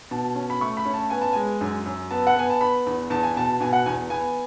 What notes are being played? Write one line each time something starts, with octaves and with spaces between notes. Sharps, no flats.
B2 A5
C#4
B5
A3 C#6
B5
C#4
A5
B3 G#5
A5
G#3 G#5
F#2
F#2
B3 A5
F#5
B3 G#5
A5
B3 B5
E2
E2 A5
G#5
B2 A5
B2 G#5
F#5
E2 G#5
B3 G#5